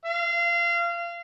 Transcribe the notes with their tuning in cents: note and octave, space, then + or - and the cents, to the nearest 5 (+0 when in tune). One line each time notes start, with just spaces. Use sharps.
F5 -25